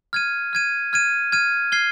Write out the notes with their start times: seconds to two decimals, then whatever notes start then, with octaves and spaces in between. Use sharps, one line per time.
0.13 F6 G#6 D#7
0.53 F6 G#6 D#7
0.93 F6 G#6 D#7
1.32 F6 G#6 D#7
1.72 F6 G#6 C7 G7